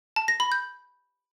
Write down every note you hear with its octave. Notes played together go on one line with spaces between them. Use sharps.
A5
A#6
B5
G6